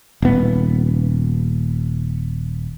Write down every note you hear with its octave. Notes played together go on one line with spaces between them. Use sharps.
D#1 B3